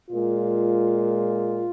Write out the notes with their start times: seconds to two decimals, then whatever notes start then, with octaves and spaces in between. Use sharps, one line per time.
0.10 A#2 G#3 F4